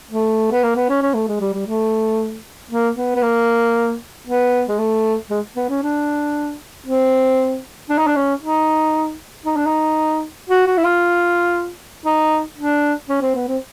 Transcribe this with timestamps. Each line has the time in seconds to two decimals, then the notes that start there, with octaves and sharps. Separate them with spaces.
0.11 A3
0.52 B3
0.63 A#3
0.76 B3
0.89 C#4
1.02 C#4
1.15 A3
1.28 G#3
1.41 G3
1.54 G3
1.67 A3
2.71 A#3
2.97 B3
3.15 B3
3.23 A#3
4.27 B3
4.69 G#3
4.79 A3
5.31 G#3
5.56 B3
5.70 C#4
5.83 D4
6.86 C4
7.90 D4
7.98 D#4
8.07 D4
8.16 C#4
8.42 D#4
9.46 D#4
9.57 D4
9.67 D#4
10.50 F#4
10.67 F#4
10.78 E4
10.84 F4
12.05 D#4
12.57 D4
13.09 C#4
13.22 C4
13.35 B3
13.48 C4